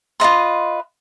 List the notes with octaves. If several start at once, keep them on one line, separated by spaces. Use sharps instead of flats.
F4 B4 D#5 C6